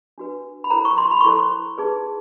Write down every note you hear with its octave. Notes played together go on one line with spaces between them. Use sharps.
D4 F#4 B4
B5
E4 A4 C5 A#5
C#6
C6
B5
C#6
E4 A4 C5 C6
D#4 G#4 B4